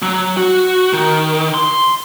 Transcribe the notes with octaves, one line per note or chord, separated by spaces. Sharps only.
F#3
F#4
D#3
C6